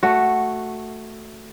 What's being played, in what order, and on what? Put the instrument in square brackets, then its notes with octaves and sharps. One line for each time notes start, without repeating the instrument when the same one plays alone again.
[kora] A3 F#4